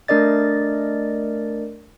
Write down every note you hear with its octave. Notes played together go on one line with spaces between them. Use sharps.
A3 D4 A#4 D5 D#5 A6